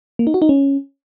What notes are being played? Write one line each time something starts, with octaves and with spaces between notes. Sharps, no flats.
A#3
D#4
F#4
D#4
C#4